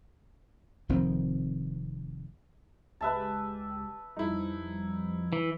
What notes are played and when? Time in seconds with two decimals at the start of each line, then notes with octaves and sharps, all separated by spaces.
0.89 F1 F2 D#3 C4
3.01 C#2 G#3 G4 B4 E5 A5
4.17 F2 F3 G3 D#4 E4
5.33 E3